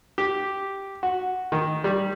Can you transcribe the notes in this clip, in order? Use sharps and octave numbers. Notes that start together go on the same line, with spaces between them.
G4
F#4
D#3
G3